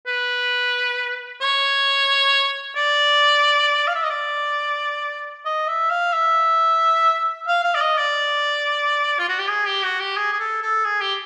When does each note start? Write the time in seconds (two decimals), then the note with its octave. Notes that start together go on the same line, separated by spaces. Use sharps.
0.07 B4
1.41 C#5
2.76 D5
3.87 F5
3.95 E5
4.03 D#5
4.10 D5
5.45 D#5
5.68 E5
5.90 F5
6.13 E5
7.47 F5
7.64 F5
7.75 D5
7.81 D#5
7.98 D5
9.19 F4
9.29 F#4
9.39 G4
9.49 G#4
9.66 G4
9.84 F#4
10.00 G4
10.17 G#4
10.33 G#4
10.40 A4
10.62 A4
10.85 G#4
11.01 G4